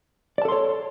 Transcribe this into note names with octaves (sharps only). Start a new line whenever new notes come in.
A4 C#5 D5 A5 C6